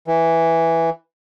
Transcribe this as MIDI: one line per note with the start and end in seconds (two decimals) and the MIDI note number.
0.08 0.90 52